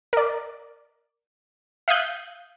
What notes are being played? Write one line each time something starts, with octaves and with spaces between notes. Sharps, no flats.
A#4 D5
E5 F5 D#6 F#6 G6